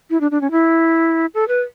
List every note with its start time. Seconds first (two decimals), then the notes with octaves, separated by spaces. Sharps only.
0.10 E4
0.21 D4
0.31 D4
0.41 C#4
0.51 E4
1.34 A4
1.48 B4